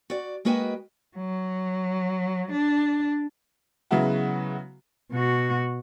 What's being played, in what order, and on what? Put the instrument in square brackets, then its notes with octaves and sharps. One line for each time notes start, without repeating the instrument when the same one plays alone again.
[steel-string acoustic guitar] F#4 D5
G#3 A#3 F#4 B4 D#5 G5
[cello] F#3
D4
[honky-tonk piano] C#3 F#3 G#3 B3 E4 F#4
[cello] B2 F#4